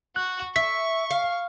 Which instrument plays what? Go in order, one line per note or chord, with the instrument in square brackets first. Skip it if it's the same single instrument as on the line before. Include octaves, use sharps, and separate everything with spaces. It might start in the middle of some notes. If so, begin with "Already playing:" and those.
[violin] F#4 [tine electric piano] F#6
[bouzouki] E5 [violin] C#6 [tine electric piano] B6
[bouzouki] F5